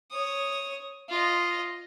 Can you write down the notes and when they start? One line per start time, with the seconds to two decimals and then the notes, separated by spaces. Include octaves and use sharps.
0.11 C#5 D#6
1.08 F4 D#5